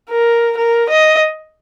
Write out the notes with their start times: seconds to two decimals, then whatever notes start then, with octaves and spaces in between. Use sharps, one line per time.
0.10 A#4
0.57 A#4
0.89 D#5